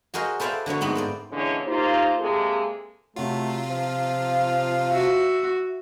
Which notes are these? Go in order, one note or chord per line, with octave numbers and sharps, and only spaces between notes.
F#4 G#4 A#4 C5 D#5
A4 B4 C5 D5 E5 F5
D3 F#3 B3 C#5
G#2 A3 B3 C4 F#4
A#3 C5 D5
A#2 D3 E3 G#3 C#4 C#5
A#3 D#4 F4 G4 C5
C3 G#3 A#3 G#4 A4
C3 F#3 A3 F4
F3 F5
F#4 E5